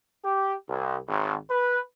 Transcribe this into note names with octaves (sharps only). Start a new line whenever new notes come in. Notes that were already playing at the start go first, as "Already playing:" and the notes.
G4
C2
G#1
B4